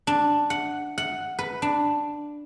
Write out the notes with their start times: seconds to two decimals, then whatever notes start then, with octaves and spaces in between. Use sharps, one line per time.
0.07 D4
0.50 F#5
0.98 F#5
1.39 B4
1.62 D4